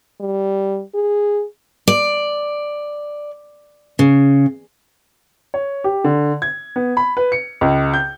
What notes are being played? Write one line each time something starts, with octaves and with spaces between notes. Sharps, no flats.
G3
G#4
D5
C#3
C#5
G4
D3
G#6
B3
B5
B4
C#7
C#2
G6